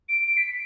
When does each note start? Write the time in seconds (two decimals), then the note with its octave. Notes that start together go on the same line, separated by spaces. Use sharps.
0.09 D7
0.24 D7
0.37 B6